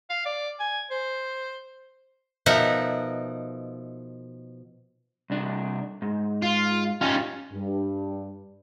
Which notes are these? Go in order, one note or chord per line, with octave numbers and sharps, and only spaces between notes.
F5
D5
G#5
C5
B2 F3 D#4 A#4 E5 F#5
C2 D4
G#2
F4
C#4 D#4 F4 G4 F5
G2